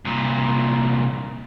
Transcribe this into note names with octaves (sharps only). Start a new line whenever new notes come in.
C2 A#2